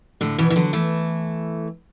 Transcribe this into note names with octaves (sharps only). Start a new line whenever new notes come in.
A2 D3
B2 E3
E3
D3 F#3
E3 A3